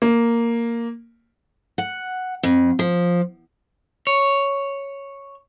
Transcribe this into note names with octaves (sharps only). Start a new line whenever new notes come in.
A#3
F#5
F2
F3
C#5